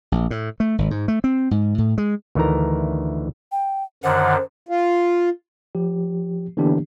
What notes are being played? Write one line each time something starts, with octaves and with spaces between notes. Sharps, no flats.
A#1
A2
A3
G#1
G#2
A3
C4
G#2
A2
G#3
D2 D#3 E3 A3 A#4 A#5
G5
F#2 D3 D#3 C5 F#5
F4
F3 G4
D3 E3 A#3 B3 D4 G4